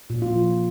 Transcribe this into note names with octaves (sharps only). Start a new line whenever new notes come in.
A#2
F4
F3